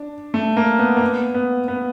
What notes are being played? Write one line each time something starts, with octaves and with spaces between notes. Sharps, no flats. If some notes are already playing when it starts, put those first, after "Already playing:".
Already playing: D4
A3
A#3
B3
A#3
B3
B3
B3